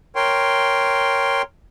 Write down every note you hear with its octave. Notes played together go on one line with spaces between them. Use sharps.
A#4 C#5 G5 C6